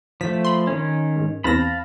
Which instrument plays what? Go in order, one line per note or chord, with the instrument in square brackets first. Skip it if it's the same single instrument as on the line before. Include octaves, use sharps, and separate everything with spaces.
[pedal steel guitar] F3 A3 [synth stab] B6
[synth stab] B5 C6
[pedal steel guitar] D#3 C#4
[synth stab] G#2
[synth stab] E2 C4 A#6 [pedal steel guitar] F5 A5 B5